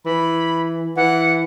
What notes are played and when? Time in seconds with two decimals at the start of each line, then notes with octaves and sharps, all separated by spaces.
0.06 E3 B5
0.97 E3 F#5